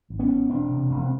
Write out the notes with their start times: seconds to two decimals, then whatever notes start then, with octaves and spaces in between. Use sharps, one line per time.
0.10 G#1
0.19 B3 C#4
0.29 G#1
0.49 E1 C4 D4
0.69 C3
0.90 E1
1.03 C4